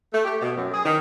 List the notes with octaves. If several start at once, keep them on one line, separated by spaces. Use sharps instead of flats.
A3
G4
B2
F#2
G#4
D#3